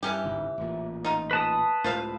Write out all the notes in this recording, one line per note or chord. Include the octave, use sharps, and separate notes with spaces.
G2 E3 C#4 G4
G1 C#2 G#2
A1 A#2
D#4 F4
B4 A5 D#6
C#2 A2 F4 C5 F5